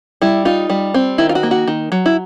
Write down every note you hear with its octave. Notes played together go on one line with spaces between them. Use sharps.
G3 E4
D#4 F4
G3
C4
D#3 E4
F4
F#4
A#3
F#4
D#3
F#3
E4